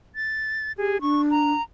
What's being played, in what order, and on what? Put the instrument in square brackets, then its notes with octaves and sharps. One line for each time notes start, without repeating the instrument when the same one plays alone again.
[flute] A6
[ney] G4 [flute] G#4
[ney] D4 [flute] C#6
[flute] A#5